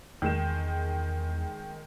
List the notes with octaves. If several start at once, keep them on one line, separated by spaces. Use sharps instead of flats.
E2 D#3 G#3 E7